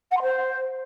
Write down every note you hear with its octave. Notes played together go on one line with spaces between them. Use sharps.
F#5
C6
C5